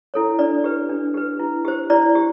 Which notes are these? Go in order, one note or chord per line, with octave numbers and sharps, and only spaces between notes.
E4 A4 C#5
D4 D5
G4 B4
D4
G4 B4
E4
G4 C5
E4 D5
G4